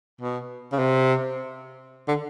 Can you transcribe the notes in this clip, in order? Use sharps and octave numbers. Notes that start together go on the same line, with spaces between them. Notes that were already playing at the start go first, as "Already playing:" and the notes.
B2
C#3
C3
D3